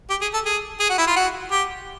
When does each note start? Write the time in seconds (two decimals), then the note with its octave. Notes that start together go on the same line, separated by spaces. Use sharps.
0.10 G4
0.21 G#4
0.34 A4
0.45 G#4
0.80 G#4
0.89 F#4
0.98 E4
1.07 F4
1.16 F#4
1.51 G4